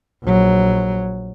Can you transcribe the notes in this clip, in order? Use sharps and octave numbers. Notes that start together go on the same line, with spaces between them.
A#1 F#3